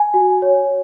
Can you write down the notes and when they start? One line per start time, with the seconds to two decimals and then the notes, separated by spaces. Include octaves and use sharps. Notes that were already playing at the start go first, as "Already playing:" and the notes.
Already playing: G#5
0.14 F#4
0.42 C#5